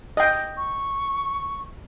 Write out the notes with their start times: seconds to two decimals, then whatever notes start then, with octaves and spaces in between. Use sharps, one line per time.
0.17 D#5 G5
0.57 C#6